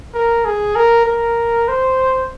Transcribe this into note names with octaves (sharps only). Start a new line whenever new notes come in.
A#4
G#4
A#4
A#4
C5